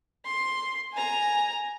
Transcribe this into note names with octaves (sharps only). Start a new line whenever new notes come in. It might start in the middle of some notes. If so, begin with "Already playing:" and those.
C6
G#5 A#5